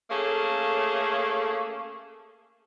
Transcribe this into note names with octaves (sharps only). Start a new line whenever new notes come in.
A3 A#3 C#4 G#4 A4